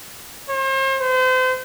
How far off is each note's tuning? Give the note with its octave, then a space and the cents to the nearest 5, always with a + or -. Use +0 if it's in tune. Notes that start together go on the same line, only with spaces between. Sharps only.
C5 +40
C5 -35